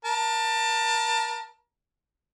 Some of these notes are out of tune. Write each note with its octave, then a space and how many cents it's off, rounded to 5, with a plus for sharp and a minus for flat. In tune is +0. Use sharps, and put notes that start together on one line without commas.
A#4 +35 A5 +25